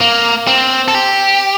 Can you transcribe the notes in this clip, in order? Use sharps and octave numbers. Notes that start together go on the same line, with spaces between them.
A#3
C4
A4
G4